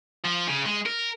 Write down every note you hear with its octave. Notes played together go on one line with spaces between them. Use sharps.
F3
C#3
G#3
A#4